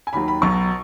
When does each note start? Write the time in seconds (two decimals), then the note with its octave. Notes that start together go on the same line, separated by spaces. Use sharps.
0.07 G#5
0.13 D#2 D#3 F#3 B5
0.28 B5
0.41 B1 B2 F#3 C#6